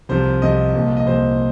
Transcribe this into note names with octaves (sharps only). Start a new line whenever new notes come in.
C2 C3 F3 C5
C2 C3 F3 D#5
C2 A#2 F3
D#5
C2 A#2 F3 C5